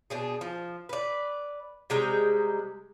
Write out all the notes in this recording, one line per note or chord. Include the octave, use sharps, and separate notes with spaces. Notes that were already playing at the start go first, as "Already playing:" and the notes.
B2 D4 G#4
F3
B4 D5
C3 G3 G#3 A#5